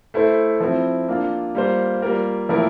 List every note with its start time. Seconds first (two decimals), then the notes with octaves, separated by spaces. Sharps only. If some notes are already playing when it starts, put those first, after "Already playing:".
0.14 A3 E4 A4 C5
0.60 F3 C4 E4
1.08 A#3 D4 F4
1.55 G3 A#3 F4 C5
2.02 G3 A#3 F4 A#4
2.49 A2 F3 A#3 E4 A#4